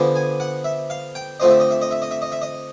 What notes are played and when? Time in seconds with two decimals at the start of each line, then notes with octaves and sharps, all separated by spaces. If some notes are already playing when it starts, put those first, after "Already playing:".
Already playing: D3 F3 G#3 B3
0.16 G#5
0.40 F#5
0.64 E5
0.90 F5
1.15 G5
1.40 D3 F3 A3 C4 D#5
1.50 E5
1.60 D#5
1.71 E5
1.82 D#5
1.91 E5
2.02 D#5
2.11 E5
2.22 D#5
2.32 E5
2.42 D#5